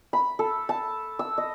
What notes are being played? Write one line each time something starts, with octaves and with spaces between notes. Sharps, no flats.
B5
A4
A5
E6
D#5